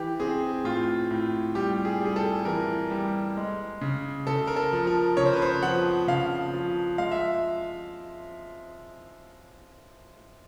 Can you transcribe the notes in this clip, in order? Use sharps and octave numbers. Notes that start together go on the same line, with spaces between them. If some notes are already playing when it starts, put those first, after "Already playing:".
Already playing: E3 G4
C4 G#4
A2 F4
A2
G3 G4
G#4
G3 G#4
A4
E3 A#4
G3
G#3
C#3
C#3 A4
A#4
A4
F3
A#4
C#3 C#5
C5
B4
C5
F3 F#5
C#3 F5
F3
G#3 F5
E5